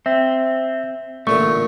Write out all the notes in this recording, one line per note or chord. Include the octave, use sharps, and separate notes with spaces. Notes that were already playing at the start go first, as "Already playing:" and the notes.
C4 E5
A1 A#2 D3 A3 C#6